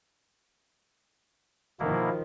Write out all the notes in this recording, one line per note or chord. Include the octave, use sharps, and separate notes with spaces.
B2 D#3 F3 A#3 E4